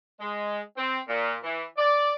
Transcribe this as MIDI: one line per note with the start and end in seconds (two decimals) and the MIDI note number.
0.20 0.60 56
0.77 0.99 60
1.08 1.35 46
1.44 1.64 52
1.78 2.15 74